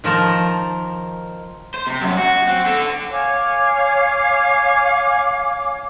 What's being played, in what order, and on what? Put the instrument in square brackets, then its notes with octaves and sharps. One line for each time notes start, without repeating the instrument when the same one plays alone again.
[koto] D#3 F3 A#4 A5
[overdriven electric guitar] C5
C3
F#2 G3
F#4
C4
D4 A4
[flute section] C#5 F5 G#5 D6